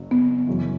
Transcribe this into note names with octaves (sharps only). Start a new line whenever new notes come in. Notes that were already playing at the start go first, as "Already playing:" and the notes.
Already playing: F#1 F#2 C#3 F#3
B3
F#2 C#3 E3